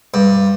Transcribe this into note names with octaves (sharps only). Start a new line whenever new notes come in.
G2